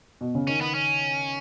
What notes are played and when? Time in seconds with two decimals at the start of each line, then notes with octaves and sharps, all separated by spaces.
0.21 B2
0.35 C#3
0.47 D#3 C#4
0.61 B3
0.74 C#4